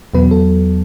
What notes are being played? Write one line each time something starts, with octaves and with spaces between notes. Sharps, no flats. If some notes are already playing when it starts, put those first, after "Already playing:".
E2 B2 F#3 B3 B4
A4